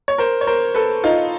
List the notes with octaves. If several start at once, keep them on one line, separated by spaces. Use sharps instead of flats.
C#5
A#4 C5
C#5
A#4 C5
A4 B4
D#4 F4